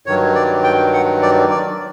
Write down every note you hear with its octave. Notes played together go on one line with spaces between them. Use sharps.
G2 D#3 F#3 C#5
D5
G5
F#5
D5
D5